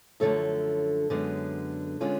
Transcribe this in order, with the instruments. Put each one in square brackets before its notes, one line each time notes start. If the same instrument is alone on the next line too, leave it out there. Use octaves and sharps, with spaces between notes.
[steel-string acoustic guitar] F#2 D3 F3 A3 A4 C#5
F#2 D3 G#3 B3
D3 G#3 B3 C#4 F4